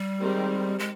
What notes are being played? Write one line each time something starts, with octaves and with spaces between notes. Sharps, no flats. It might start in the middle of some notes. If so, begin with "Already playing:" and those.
Already playing: G3
D#3 G#3 C4 G4 A#4
G#3